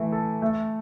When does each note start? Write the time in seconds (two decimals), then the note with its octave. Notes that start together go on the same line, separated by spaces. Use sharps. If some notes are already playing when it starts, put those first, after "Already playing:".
Already playing: E3 A3 E4
0.12 A4
0.42 A3